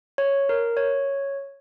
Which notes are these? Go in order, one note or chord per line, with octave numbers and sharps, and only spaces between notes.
C#5
A#4
C#5